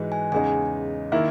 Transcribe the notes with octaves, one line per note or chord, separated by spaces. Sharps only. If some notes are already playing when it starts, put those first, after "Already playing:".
Already playing: G#2 E3 G#3 D#4 F#4
G#5
E2 C#3 G#3 D#4 G#5
D#3 A#3 E4 E5